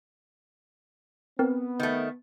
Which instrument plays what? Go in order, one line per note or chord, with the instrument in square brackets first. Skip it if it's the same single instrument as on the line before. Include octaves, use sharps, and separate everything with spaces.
[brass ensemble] B3 [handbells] C4 A#4
[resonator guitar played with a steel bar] D#3 A3